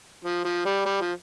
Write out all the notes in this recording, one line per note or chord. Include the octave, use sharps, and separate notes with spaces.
F3
F3
G3
G3
F3